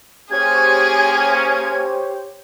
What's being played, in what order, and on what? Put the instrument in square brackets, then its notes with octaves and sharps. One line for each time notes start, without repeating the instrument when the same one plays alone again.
[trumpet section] A#3 C#4 [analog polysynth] G4 C5 C#5 [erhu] G#4 [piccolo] G#6